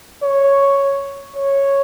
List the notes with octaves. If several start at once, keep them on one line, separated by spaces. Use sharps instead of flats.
C#5
C#5